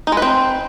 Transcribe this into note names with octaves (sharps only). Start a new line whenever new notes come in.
D#4
G#3
B4
C4